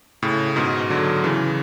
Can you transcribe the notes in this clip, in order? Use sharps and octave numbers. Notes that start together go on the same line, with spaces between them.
A2 C#3
G#2 B2
D3 F#3
C#3 E3